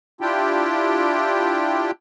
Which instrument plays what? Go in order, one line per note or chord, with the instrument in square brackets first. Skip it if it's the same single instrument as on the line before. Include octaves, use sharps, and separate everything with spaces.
[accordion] D4 E4 F4 G4 G5